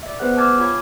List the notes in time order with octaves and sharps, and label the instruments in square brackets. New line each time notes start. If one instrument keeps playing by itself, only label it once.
[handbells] D5 E5
B3 G#4 B4 C5 F#5 F#6
G#5 A5 D6 F6 G#6 A6
F4 C#5 G#5 B5 G#6